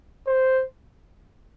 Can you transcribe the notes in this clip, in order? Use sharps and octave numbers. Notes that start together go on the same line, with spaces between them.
C5